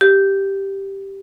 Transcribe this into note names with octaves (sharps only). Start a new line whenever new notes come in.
G4